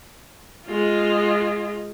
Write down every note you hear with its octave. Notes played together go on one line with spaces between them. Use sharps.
G#3 F4